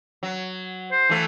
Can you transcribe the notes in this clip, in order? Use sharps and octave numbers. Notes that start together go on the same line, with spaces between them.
F#3
C5
E3 A3